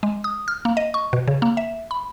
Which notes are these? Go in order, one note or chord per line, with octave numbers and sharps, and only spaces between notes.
G#3
D#6
F6
A#3
D#5
C#6
B2
C#3
A#3
E5
B5